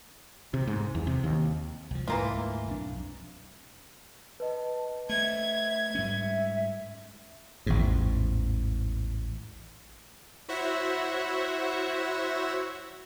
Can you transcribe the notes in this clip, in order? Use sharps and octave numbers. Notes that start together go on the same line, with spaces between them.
C3
G#2
E2
C3
D#2
C2 F3
D2 G#2 E3 A3 A#3 F4
B1 F2 D4
B4 D#5 A5
A3 E5 G#6
G#2 G3 C#4 E5
A1 E2 G#2
E4 F#4 C5 C#5 E5 F#5